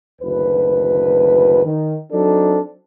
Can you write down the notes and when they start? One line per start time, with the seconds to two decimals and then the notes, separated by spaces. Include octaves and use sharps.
0.21 F#1 D2 D#3 B4
1.64 D#3
2.12 F#3 C4 D4 D#4 A4